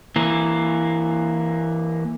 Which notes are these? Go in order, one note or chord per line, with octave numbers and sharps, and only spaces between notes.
E3 A#3